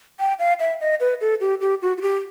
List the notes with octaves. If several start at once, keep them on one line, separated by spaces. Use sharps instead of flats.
G5
F5
E5
D#5
B4
A4
G4
G4
F#4
F#4
G4